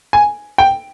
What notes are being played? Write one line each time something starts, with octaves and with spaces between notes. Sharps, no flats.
G#5
G5